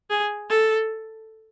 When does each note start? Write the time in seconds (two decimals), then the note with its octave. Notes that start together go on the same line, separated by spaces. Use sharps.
0.10 G#4
0.50 A4